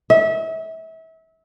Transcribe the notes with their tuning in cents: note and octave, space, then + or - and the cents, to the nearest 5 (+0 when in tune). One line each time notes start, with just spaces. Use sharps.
E5 -30